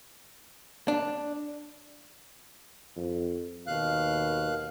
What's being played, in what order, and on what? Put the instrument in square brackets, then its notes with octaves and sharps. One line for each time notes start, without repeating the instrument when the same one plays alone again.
[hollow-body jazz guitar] D4
[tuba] F2
[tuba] D#2 [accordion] B2 F5 F#6